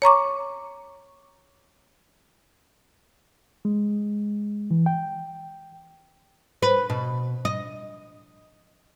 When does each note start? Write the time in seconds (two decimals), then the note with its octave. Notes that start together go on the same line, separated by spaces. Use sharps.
0.02 C#5 A#5 C#6 D6
3.65 G#3
4.71 E3
4.86 G5
6.62 B4
6.90 B2
7.45 D#5